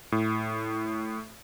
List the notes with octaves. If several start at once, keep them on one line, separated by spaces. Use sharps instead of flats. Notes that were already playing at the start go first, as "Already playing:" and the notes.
A2